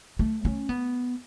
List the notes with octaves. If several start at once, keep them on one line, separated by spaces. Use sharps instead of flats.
A3
C#4
B3